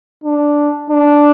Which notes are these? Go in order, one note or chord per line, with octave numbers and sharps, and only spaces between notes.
D4
D4